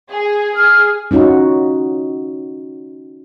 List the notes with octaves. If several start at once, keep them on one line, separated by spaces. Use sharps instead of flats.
G#4
G#4 F6
C#4 D#4 F4 F#4